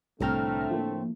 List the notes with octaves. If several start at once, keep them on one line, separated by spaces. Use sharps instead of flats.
C2 A2 D3 A3 C4 G5 A#5 F6
F3 A#3